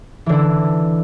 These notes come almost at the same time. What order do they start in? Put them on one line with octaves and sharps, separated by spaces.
E3 D3 E4